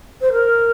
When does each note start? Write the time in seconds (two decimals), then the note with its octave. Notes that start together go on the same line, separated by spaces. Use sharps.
0.21 C5
0.32 A#4